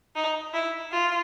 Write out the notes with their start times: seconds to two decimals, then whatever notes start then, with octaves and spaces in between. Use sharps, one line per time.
0.16 D#4
0.54 E4
0.92 F4